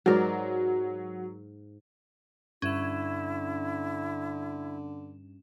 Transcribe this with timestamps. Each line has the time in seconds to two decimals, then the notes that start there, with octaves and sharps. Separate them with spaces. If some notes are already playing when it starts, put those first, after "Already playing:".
0.06 G#2 F#3 A#4 D5
2.62 G2 D3 C#4 E4 E7